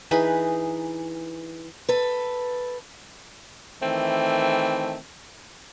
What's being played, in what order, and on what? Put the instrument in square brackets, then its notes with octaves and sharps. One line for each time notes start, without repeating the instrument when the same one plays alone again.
[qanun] E3 D#4 G#4 B4
[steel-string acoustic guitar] A4 B4
[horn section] D#3 E3 A3 C4